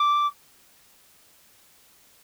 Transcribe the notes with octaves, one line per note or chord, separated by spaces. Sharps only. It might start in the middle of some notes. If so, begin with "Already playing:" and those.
Already playing: D6